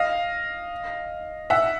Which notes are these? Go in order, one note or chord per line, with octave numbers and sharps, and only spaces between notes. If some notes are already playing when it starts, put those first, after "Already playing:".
Already playing: D#5 F5
E5 F#5